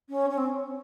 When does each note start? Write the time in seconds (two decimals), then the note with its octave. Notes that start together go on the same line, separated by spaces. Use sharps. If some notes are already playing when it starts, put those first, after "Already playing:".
0.09 C#4
0.30 C#4
0.37 C4